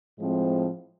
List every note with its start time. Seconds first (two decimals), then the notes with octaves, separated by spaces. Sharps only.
0.17 A2 F3 G#3 C4